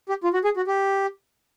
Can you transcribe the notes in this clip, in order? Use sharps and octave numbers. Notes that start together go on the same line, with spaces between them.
G4
F4
F#4
G#4
F#4
G4